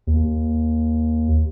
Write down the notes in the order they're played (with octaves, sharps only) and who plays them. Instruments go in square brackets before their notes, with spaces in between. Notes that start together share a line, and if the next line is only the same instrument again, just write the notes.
[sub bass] D#2